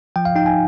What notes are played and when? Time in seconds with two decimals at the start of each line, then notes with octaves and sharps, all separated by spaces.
0.16 F3 G5
0.25 F5
0.36 D#4 G5
0.46 G#5